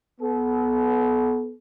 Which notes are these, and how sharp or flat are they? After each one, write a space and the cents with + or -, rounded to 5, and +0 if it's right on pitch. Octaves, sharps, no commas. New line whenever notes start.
B3 +0 A4 -40